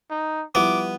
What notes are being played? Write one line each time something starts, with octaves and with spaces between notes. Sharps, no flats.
D#4
F3 G3 B3 E4 D6